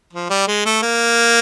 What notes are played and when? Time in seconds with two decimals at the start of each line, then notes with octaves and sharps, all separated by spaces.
0.13 F3
0.30 G3
0.47 G#3
0.66 A3
0.82 A#3